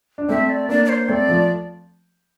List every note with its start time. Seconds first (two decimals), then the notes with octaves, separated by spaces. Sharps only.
0.18 D4
0.29 A3 C4 E5
0.50 D5
0.69 A#3 D4 D5
0.85 D5
0.89 C5
1.08 A3 C4 D5
1.29 F3 A3